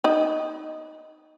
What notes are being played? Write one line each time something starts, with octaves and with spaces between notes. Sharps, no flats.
D#4 D#5